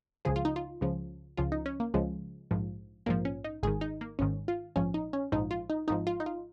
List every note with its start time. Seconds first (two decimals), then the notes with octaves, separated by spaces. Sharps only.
0.25 C#2 C#3 F3 G#4
0.36 F4
0.45 D#4
0.56 F4
0.81 C#2 C#3 F3
1.37 C#2 C#3 F3 F4
1.52 D#4
1.66 C#4
1.80 A#3
1.94 C#2 C#3 F3 G#3
2.51 A#1 G#2 F3
3.06 A#1 G#2 F3 A#3
3.25 C#4
3.44 D#4
3.63 G#1 G#2 D#3 G#4
3.81 D#4
4.01 A#3
4.19 G#1 G#2 D#3 C#4
4.48 F4
4.76 A#1 G#2 F3 C#4
4.94 D#4
5.13 C#4
5.32 A#1 G#2 F3 D#4
5.51 F4
5.70 D#4
5.88 G#1 G#2 F3 D#4
6.07 F4
6.20 D#4
6.26 F4